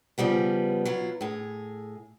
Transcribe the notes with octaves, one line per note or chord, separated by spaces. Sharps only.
C#3 F3 G3 B3
F#3 E4 F4
A2 G#4